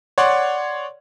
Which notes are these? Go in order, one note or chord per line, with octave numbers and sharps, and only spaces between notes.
C#5 D5 F#5 C6 C#6